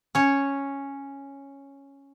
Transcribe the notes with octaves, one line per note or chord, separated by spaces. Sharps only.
C#4 C#5